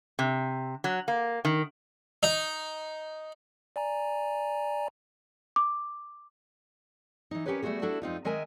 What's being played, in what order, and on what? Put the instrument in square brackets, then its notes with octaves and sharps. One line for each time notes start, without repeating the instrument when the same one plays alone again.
[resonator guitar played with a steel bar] C3
F#3
A#3
D#3
[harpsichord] D#4
[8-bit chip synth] D5 G#5 A#5
[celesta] D6
[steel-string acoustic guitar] E3 D#4
C#4 D4 G4 A#4 B4 C#5
G3 A3 B3 F4 F#4 G#4
D4 E4 F#4 A4
F2 C4 D#4 F4
D#3 G#3 A#4 D#5 E5 G#5